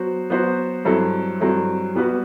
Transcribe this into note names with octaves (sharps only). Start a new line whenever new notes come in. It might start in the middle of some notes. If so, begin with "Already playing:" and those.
Already playing: F#3 B3 F#4 C5
F#3 B3 F#4 C5
G2 F#3 C4 E4 A4
G2 F#3 C4 E4 A4
G3 B3 F#4 B4